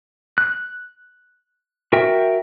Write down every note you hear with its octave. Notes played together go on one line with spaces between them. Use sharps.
F#6
F#4 A#4 E5 G5